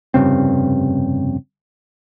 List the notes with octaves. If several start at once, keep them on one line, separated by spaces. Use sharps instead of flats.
F1 G2 C#3 C4